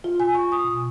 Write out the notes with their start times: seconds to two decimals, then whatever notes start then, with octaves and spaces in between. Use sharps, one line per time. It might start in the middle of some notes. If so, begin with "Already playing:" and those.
0.04 F4
0.20 G#5
0.35 C#6
0.52 D#6
0.64 B2